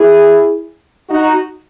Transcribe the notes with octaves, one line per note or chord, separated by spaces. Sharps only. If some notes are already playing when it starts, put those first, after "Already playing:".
Already playing: E4 G#4
D#4 F#4